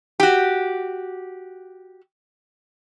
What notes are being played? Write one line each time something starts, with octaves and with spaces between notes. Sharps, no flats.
F#4 G4